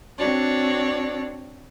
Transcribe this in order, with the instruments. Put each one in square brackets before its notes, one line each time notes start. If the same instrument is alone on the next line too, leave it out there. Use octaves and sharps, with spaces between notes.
[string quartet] C4 D4 F#4 C#5 D5